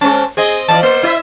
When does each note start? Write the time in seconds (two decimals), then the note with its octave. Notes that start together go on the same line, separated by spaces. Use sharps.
0.01 G#3 C4 C#4 A5
0.37 C4 G#4 D#5
0.68 E3 F3 D5 A5
0.83 A#3 C5
1.03 E4 D5 E5